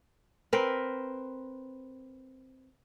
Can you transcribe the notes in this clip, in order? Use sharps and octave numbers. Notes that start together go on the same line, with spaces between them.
C4 A#4 B4